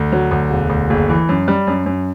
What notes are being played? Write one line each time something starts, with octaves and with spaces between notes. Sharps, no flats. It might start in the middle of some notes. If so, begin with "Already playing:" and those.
Already playing: D2
F#3
D2
E1
D2
F#1
E3
F#2
G3
F#2
F#2